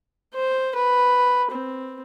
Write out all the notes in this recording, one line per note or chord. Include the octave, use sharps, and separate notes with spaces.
C5
B4
C4